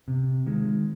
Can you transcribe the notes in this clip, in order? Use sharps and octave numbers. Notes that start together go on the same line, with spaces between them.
C3
D#3 G#3